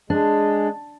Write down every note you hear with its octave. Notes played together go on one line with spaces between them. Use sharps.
G#3 D4